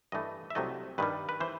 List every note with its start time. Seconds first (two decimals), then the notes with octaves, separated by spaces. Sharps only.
0.12 G2 E3 A3 D#5
0.50 E5
0.55 C2 C3 F#3 A3 D#5
0.98 G2 D#3 G3 B4
1.29 B4
1.40 E3 C5